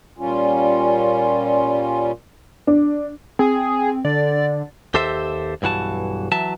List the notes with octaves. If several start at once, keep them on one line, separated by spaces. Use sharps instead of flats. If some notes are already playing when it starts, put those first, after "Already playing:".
A#2 G3 C#4 F4
D4
C4 G#4
D3 D5
D#2 G4 A4 C5 E5
B1 G2 E3 F#4 A5
E3 F#3 E5 A5